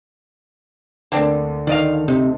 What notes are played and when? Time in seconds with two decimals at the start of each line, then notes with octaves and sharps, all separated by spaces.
1.12 D2 D3 A#3 C4 D4
1.67 D#3 D5 D#5 F5
2.08 C3 D#4